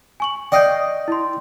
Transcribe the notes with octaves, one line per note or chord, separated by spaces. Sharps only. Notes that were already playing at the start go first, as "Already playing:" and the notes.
G#5 C#6 F#7
D5 D#5 F5 G5 G6
E4 C6